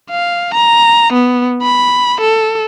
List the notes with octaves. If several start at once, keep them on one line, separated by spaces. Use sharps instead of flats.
F5
A#5
B3
B5
A4